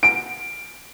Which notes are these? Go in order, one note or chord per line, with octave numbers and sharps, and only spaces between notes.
D7